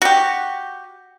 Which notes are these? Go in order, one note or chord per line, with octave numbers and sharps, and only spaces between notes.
F#4 G4